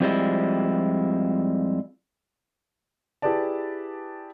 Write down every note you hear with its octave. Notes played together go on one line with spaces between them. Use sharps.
F2 F3 G3 G#3 E4
E4 G4 G#4 B4 D5 A5